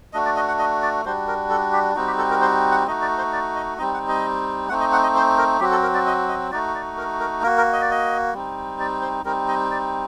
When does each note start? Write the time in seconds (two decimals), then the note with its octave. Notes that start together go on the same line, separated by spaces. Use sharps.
0.13 A3 D4 F#4 D#5
0.25 D5
0.36 D#5
0.48 F#5
0.59 D#5
0.83 D5
1.05 G3 D4 F#4 C5
1.27 A#4
1.50 A4
1.73 G4
1.95 G3 C4 D#4 F#4
2.07 G4
2.18 A4
2.31 A#4
2.41 C5
2.71 F#5
2.86 A3 D#4 F#4 D#5
3.02 D5
3.18 C5
3.33 D5
3.55 D#5
3.78 G3 C4 D#4 D#5
3.94 F#5
4.08 D#5
4.69 A3 C4 D#4 F#5
4.80 D#5
4.92 F#5
5.03 D#5
5.15 C5
5.37 A#4
5.60 F#3 C4 F#4 G4
5.71 A4
5.83 A#4
5.94 D5
6.07 D#5
6.28 D#5
6.52 A3 D#4 F#4 D5
6.75 D5
6.98 A#4
7.20 A#4
7.43 A#3 F#4 A#4
7.57 A#4
7.73 D#5
7.82 D5
7.91 D#5
8.33 G3 C4 D#4
8.80 D5
9.02 C5
9.24 G3 C4 D#4 A#4
9.48 D#5
9.71 D5